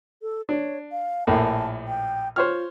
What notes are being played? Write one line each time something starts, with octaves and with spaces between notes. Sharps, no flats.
A4
D4 C#5
F5
A#1 A2 A#3 A5
G5
F4 C5 C#5 F6